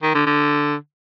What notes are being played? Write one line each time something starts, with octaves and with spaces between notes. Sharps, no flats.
D#3
D3
D3